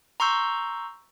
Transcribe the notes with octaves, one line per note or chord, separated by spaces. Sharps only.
A#5 C6 C#6 E6 G6